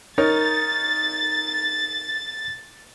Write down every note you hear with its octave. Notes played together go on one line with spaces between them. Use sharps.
D#4 A#4 C#5 A6